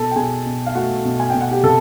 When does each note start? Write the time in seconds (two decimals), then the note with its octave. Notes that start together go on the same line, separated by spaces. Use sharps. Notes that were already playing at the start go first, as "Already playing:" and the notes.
Already playing: B2 A4 A5
0.11 G5
0.16 B2 G#4 G#5
0.46 B2
0.67 F5
0.75 A3 F#4 F#5
1.05 B2
1.20 G#5
1.30 B2 G5
1.41 F#5
1.51 G4 G5
1.63 C3 A4 A5